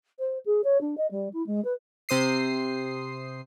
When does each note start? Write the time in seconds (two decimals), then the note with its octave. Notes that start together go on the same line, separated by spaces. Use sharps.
0.19 C5
0.46 G#4
0.64 C#5
0.81 D4
0.98 D#5
1.11 G3
1.33 E4
1.47 G#3
1.65 B4
2.09 C3 C5 D#6 C7